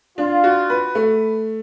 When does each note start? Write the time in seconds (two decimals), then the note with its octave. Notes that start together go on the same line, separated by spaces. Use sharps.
0.18 D4 F4
0.44 F#4
0.70 B4
0.95 A3